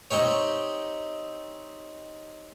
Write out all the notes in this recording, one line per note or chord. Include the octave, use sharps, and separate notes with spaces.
C4 D#4 G4 C#5